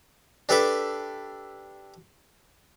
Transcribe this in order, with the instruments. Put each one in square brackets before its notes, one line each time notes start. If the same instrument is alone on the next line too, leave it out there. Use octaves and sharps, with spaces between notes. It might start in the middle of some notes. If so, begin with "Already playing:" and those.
[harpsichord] D4 G4 A4 B4 E5 D6